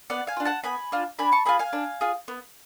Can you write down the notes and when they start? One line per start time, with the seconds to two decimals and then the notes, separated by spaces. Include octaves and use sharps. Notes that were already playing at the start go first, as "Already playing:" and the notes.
0.10 B3 D5 F#5
0.27 F5 G#5
0.36 D4 F4
0.45 F#5 A5
0.64 B3 G#5 B5
0.92 D4 F4
1.19 D4 G#5 B5
1.32 A5 C#6
1.46 F4 G#4 G#5 B5
1.59 F5 G#5
1.73 D4
2.01 F4 G#4
2.28 B3